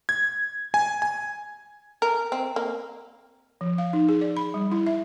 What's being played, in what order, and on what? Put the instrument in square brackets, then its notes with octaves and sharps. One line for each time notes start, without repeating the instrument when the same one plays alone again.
[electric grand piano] G#6
G#5
G#5
[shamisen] A#4
C4
A#3
[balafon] F3
F5
D#4
G#4
D5
B5
G3
E4
E5